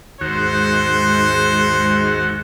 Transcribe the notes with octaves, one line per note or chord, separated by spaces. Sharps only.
D#2 G#2 G#3 F#4 C5